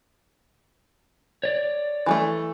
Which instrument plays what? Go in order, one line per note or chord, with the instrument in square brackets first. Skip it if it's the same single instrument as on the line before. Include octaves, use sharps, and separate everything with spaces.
[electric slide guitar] C#5 D5
[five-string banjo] E3 G#3 A3